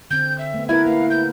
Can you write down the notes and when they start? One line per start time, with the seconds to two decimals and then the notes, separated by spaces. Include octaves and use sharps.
0.11 D3 C4 G6
0.39 E5
0.54 A3 B3
0.69 B3 E4 A#4 B4 G#6
0.86 A#3 F5
1.10 G6